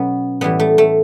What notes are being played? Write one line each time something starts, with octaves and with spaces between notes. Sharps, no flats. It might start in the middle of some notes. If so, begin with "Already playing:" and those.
Already playing: B2 F#3 B3 C#4
A2 E3 G3 B3
A3
A3